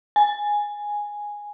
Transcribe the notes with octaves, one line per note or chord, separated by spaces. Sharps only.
G#5